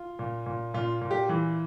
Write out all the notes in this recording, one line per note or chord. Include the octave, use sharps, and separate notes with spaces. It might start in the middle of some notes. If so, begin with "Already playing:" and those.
Already playing: F4
A#2
A#2
A#2 F4
A#2
G4
E3